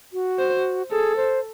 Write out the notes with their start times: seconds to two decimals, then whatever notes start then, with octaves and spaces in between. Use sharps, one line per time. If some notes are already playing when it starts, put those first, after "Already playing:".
0.13 F#4
0.39 C5
0.90 G#4 A4
1.16 C5